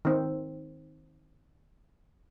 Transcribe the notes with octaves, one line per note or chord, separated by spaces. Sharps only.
D#3 C4